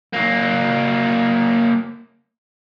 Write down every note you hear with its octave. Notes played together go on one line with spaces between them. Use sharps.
F#3 A#3